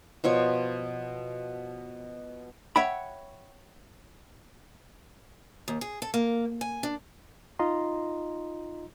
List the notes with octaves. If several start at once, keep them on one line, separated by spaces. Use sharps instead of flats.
B2 F3 C#5
C#5 E5 F#5 G5 B5
D#2
G#4
A4
A#3
G#5
D4
D#4 F4 D#5 A#5 C6